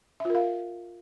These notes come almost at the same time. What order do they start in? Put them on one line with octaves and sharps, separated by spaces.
E5 F4 A#4 F5